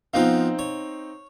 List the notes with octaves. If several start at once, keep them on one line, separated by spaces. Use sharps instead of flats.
F3 B3 C4 D#4 F4 F5
C#5